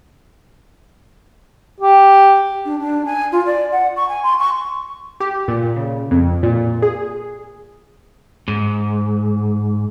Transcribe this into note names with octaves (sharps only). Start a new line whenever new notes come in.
G4
D4
D4
G#5
F4
D5
F#5
C#6
G#5
C6
C#6
G4
A#2
C#3
F2
A#2
G#4
G#2